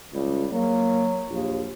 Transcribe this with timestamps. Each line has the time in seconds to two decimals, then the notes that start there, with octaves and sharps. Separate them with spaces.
0.14 C#2 G3
0.52 F#3 A#3
1.29 A#1 D#2